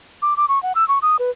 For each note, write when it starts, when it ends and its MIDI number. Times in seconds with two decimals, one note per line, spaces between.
0.22 0.34 86
0.37 0.46 86
0.49 0.61 85
0.63 0.73 78
0.75 0.87 88
0.88 0.99 85
1.02 1.17 87
1.19 1.30 71